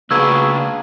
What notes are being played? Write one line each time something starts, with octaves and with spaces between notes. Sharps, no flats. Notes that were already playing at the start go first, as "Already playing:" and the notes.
C#3 A#3 D4 F#4 G#4 B4 E6 G#6